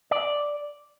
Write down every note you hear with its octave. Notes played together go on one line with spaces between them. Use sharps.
D5